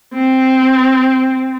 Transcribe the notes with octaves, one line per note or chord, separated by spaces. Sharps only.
C4